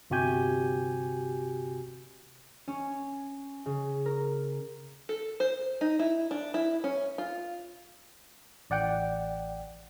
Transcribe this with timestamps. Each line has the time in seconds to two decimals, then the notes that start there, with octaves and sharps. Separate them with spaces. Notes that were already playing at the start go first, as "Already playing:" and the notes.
0.10 G1 C3 F#4 G4 G#5 G6
2.68 C#4
3.66 C#3
4.06 A#4
5.09 A4
5.40 C5
5.81 D#4
5.99 E4
6.31 D4
6.54 E4
6.84 C#4
7.18 F4
8.70 A1 D5 F#5 G5